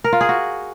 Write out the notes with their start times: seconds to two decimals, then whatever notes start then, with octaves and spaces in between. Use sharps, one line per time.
0.04 A#4
0.13 F4
0.21 G#4
0.29 F#4